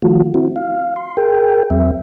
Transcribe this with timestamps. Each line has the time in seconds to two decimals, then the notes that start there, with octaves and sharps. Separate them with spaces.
0.02 D#3 F3 A3 F4 F#4
0.34 C4 E4 F#4
0.56 F5
0.96 C6
1.17 G#4 A#4 G5
1.70 E2 F#3 C4 E5